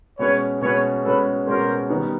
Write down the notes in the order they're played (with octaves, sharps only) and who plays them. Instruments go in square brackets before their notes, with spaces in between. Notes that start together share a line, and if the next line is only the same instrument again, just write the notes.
[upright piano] B2 G#3 C#4 [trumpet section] B4 C#5
[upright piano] B2 G#3 C#4 [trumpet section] B4 C#5
[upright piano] B2 G#3 C#4 [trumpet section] A4 B4
[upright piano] B2 G#3 C#4 [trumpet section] A#4 C5
[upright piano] D#3 G3 B3 D#4